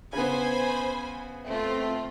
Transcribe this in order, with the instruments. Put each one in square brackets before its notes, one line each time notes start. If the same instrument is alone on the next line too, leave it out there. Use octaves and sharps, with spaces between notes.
[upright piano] C#3 B3 [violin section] C5 G#5 B5
[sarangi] A3 [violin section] C4 F4